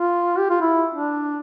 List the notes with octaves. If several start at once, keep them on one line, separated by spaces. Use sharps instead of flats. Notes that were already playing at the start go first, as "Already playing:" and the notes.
Already playing: F4
G4
F4
E4
D4